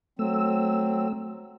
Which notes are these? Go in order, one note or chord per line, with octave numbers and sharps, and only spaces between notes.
F#3 A3 C4 E6